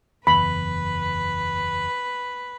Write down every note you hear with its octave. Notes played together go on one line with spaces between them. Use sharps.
F#1 E2 B4 B5